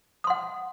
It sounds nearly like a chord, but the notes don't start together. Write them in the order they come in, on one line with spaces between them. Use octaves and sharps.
D#6 C6 F#5